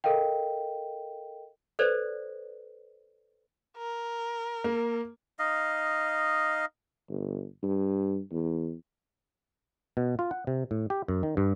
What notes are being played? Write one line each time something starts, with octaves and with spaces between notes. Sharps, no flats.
A4 A#4 D#5 F5 G5
A4 B4 C5 D5
A#4
A#3
D#4 D#5 F5
G1
G2
E2
B2
F4
F#5
C3
A2
G4
F#2
D#3
G2